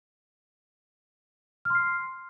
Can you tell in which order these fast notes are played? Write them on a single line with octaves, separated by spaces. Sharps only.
F6 C6 C7